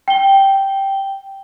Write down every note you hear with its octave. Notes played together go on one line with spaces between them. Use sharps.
G5 G7